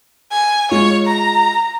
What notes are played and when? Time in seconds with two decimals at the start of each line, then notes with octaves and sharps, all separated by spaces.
0.31 G#5
0.71 G#3 F4 C#5
1.06 A#5